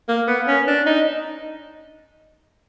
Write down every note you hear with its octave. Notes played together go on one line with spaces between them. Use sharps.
A#3
B3
C#4
D4
D#4